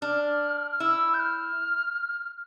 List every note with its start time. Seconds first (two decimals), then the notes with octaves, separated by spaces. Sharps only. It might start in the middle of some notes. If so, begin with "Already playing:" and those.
0.02 D4 F6
0.71 F6
0.80 E4 E6
1.14 G6
1.20 F6